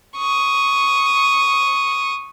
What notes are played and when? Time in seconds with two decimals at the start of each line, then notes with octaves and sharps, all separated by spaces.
0.17 C#6 D#6